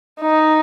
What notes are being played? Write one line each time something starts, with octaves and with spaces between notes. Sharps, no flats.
D#4